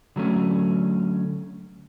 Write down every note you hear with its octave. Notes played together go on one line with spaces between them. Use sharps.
D3 F#3 A3 C#4